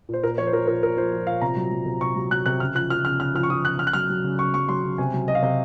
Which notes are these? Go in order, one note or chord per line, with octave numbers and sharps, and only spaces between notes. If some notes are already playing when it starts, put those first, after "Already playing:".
A#2 C5
A#2 A#4
F3 C#5
C5
F3 A#4
A#2 A#4
A#2 A#4
F3 C5
F3
A#2 F5
C3 A#5
F#3
F#3
C3
C3 C#6
F#3
F#3 F#6
C3 F#6
C#3 F6
F3 F#6
F3 F6
C#3 F6
C#3 F6
F3 F6
C#6
F3 D#6
C#3 F#6
C#3 F6
F#6
F#3 F6
F#3
C#3
C#3 C#6
F#3 C#6
F#3 C6
C#3
C3 G#5
F#3
F#3 D#5
F5
C3 D#5